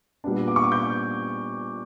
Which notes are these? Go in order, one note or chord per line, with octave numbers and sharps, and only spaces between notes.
A#2 G3 B3 D4
D6
C#6
D6
G6